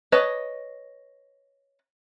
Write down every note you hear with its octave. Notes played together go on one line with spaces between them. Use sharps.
B4 C#5 D#5 A5